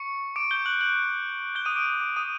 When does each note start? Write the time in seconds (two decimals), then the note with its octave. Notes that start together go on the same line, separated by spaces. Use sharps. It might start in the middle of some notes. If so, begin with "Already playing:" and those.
Already playing: C#6 C#7
0.36 D6 D7
0.51 G6 G7
0.66 F#6 F#7
0.81 F#6 F#7
1.55 G6 G7
1.65 D#6 D#7
1.76 D6 D7
1.86 D6 D7
2.01 D6 D7
2.16 D#6 D#7